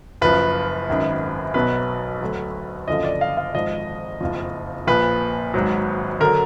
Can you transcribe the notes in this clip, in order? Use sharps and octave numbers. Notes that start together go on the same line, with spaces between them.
F#1 F#2 F3 B4
G#1 F#2 D#3
B1 B2 F#3 B4
D2 D3 F#3
F#1 F#2 D3 F3 D#5
D5
F5
F5
G#1 G#2 F3 D#5
F#1 F2 F3
A#1 A#2 F3 B4
G#1 G#2 F#3
D3 F#3 A#4